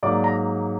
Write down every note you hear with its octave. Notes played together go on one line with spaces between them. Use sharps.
G#2 F#3 A#3 D5 D6
A#5